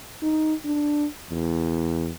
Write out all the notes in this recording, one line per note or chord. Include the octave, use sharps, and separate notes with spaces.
D#4
D4
E2